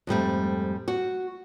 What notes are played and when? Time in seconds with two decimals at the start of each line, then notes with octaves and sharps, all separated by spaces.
0.07 F2 G#2 G3 A3
0.88 F#4